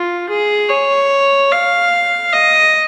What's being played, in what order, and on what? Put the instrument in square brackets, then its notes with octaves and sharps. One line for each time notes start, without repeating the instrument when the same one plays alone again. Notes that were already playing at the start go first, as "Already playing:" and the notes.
Already playing: [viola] F4
G#4
C#5
F5
D#5